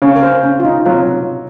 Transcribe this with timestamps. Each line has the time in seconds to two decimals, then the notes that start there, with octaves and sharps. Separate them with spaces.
0.02 C#3 C#4 C#5
0.16 A#4
0.23 C5
0.43 C#3
0.60 F4
0.65 D#4
0.85 F#3 F4